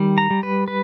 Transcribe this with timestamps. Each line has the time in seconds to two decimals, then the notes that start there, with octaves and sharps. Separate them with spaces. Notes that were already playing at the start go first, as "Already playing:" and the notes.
Already playing: D#3 G3
0.18 A#5
0.30 G3
0.43 B4
0.68 B4